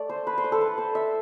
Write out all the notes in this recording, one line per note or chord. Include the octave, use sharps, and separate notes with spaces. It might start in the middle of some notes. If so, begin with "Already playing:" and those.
Already playing: A3 D5
C5
B4
C5
B4
A4
B4
C5
E5